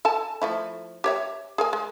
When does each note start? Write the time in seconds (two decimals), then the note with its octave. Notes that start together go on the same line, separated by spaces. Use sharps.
0.05 A4 G#5 A5
0.42 F3 A3 E4
1.04 G4 C#5 E5
1.58 G#4 A#4 G#5
1.73 G#3